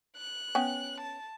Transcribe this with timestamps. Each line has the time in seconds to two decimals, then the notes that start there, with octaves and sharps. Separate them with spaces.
0.17 F#6
0.55 B3 C#4 G5
1.00 A5